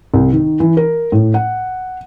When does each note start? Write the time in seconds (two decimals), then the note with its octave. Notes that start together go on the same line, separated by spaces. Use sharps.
0.14 C2
0.33 D#3
0.60 E3
0.77 A#4
1.12 A2
1.34 F#5